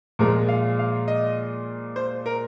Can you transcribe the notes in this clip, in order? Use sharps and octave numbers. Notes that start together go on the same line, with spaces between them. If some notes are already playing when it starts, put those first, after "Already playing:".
A#2 F3 G#3 A#4
F5
F5
D#5
C5
A#4